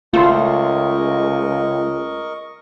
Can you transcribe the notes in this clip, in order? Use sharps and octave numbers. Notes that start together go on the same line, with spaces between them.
C#2 A3 F4 A#4 D#5 C6 C#6